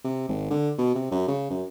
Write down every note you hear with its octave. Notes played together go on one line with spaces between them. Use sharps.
C3
G#1
D3
B2
C3
F#2
C#3
F#2